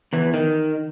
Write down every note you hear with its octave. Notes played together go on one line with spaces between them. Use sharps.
E2 E3
D#3